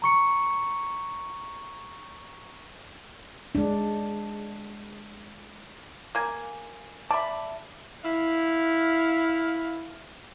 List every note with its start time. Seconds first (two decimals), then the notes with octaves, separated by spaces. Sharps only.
0.02 A#5 C#6 C#7
3.55 G#3 D4
6.15 A#3 G#5
7.11 D5 E5 A5 B5
8.04 E4 F5